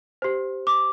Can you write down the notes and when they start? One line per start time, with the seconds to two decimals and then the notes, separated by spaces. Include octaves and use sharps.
0.22 G4 C5
0.67 D6